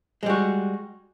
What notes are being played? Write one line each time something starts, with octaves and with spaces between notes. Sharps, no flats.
G3 G#3 F#4